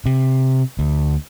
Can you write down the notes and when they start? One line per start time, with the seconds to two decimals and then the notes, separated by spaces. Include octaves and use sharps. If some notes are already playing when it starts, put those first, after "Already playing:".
0.06 C3
0.79 D2